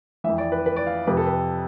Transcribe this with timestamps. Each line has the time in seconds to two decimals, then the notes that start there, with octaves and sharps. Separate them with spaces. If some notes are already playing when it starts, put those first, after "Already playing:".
0.24 E3 E5
0.28 F2
0.38 D5
0.52 B4
0.66 B4
0.76 D5
0.87 F5
1.07 F2 C3 F3 B4
1.17 A4
1.26 B4